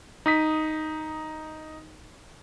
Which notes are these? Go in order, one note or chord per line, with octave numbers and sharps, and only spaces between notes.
D#4 D#6 B6